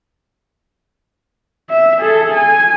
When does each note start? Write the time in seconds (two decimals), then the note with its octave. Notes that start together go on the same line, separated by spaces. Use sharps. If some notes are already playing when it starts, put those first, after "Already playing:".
1.70 E5
2.00 G#4 A4
2.33 G#5